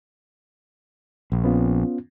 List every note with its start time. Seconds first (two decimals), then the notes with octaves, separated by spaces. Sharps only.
1.32 A#1
1.44 B3 C#4 F4